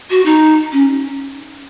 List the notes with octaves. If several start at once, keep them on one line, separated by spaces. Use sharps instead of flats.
F#4
D#4
C#4